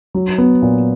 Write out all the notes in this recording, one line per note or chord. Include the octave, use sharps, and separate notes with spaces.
F#3
B3
A#2